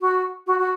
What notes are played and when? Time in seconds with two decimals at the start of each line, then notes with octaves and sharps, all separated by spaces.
0.01 F#4
0.47 F#4
0.59 F#4